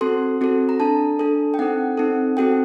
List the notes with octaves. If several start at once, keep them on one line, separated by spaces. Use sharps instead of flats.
C4 F#4 A4 C6
C4 F#4 A4
A#5
D4 A4 A5
D4 A4
G5
C4 D#4 A4 F#5
C4 D#4 A4
C4 F#4 A4 G5